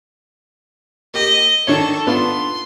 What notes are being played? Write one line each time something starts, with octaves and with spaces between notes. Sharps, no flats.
A#3 G4 D#5
D#3 D4 A4 C#5 C#6
B3 D4 F4 C6